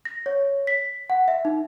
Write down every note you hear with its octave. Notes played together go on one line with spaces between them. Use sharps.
A#6
C#5
B6
F#5
E5
D#4